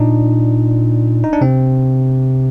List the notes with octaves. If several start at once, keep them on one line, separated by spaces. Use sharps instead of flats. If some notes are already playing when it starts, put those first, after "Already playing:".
Already playing: A#2 D4 D#4
D#4
D4
C3 C4